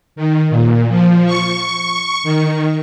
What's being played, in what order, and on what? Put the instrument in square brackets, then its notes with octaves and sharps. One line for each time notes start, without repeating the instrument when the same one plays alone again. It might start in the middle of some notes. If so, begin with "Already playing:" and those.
[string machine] D#3
A#2
F3
C#6
D#3